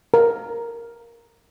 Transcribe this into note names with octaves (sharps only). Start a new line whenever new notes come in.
A#4